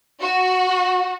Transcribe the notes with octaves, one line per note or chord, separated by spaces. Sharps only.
F#4